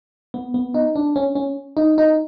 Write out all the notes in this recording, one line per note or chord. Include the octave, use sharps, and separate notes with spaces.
B3
B3
D#4
D4
C#4
C#4
D#4
D#4